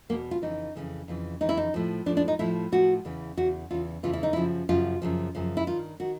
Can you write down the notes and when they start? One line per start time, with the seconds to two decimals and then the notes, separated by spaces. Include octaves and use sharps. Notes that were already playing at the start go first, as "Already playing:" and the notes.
0.09 E2 B2 A#3
0.31 F4
0.42 F2 C#3 E3 D#4
0.75 F2 C#3 E3
1.08 F2 C#3 E3
1.41 F2 C#3 E3 D#4
1.49 E4
1.57 D#4
1.74 A2 F3
2.06 F3 D4
2.09 A2
2.17 D4
2.28 D#4
2.39 A2 F3 E4
2.72 A2 F3 F#4
3.05 E2 C#3 E3
3.37 E2 C#3 E3 F#4
3.71 E2 C#3 E3 F4
4.03 E2 C#3 E3 F4
4.13 E4
4.23 D#4
4.33 F#2 C#3 F3 E4
4.69 F#2 C#3 F3 F4
5.02 F#2 C#3 F3
5.35 F#2 C#3 F3
5.57 E4
5.67 G2 D#3 F4
6.00 D#3 F#4